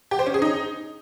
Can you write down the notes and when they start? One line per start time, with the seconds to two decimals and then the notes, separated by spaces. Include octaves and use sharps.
0.11 G4
0.19 C5
0.27 C#4
0.34 G#4
0.42 D#4